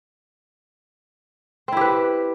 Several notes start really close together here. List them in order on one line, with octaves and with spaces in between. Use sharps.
C4 E4 G4 B4